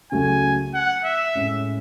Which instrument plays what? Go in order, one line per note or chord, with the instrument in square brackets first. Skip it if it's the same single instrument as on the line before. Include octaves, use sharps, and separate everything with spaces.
[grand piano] C#2 C#3 F#3 A3 [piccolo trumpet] G#5
[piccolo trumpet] F#5
E5
[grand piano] A2 G#3 C#4